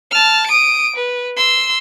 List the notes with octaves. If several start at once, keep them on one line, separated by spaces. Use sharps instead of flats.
A5 F6
D#6 D7
B4
C6 E6